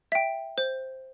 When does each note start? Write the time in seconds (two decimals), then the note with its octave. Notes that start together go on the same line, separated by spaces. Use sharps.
0.12 E5 G5
0.58 C5